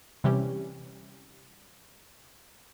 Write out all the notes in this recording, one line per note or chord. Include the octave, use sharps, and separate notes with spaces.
C3 E3 G3 C#4 G4